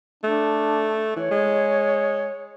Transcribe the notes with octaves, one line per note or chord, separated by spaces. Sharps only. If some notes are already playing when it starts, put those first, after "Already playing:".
A3 D4
E3 C#5
G#3